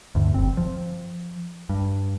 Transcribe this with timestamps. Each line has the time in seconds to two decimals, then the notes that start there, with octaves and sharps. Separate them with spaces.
0.15 D2 G2
0.34 F#1 C4
0.57 F3
1.69 G2